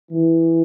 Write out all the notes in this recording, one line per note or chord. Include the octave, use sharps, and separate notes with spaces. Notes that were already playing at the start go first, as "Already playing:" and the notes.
E3